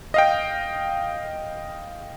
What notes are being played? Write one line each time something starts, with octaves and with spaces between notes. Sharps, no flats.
D#5 F5 G5